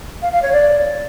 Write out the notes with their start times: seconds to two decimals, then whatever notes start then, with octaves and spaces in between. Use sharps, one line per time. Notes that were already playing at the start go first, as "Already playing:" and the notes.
0.22 F5
0.32 F5
0.42 C#5
0.53 D5